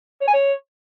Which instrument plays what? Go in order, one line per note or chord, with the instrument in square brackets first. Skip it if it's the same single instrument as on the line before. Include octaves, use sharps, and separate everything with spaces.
[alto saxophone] C#5
G#5
C#5